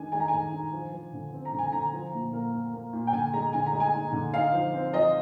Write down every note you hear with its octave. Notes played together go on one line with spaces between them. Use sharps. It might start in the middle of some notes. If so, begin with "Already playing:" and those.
Already playing: D#3 G#3 D4 G#5
G#3 G#5
A#5
D#3 G#5
D4
F3
F3
D3
C4
A#5
D3
G#5
D3 A#5
F3
A#2
A#3
A#3
A#3
A#2
G5
D3 G#5
G#3 A#5
D3 G#5
A#5
G#3
G#5
D#4
D3
D#4 F5
F3
C4
F3 D#5